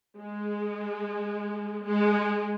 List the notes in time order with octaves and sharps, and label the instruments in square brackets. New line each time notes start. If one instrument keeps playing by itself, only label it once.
[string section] G#3
G#3